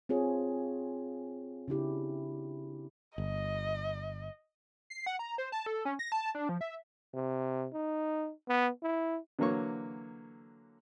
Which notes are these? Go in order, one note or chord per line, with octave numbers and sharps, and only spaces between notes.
C4 F4 G#4 C#5
C#3 D4 E4 G4
G1 D#5
C7
F#5
A#5
C5
A5
A4
C#4
A#6
A5
D4
F3
E5
C3
D#4
B3
E4
D3 E3 F#3 A#3 C#5 C#6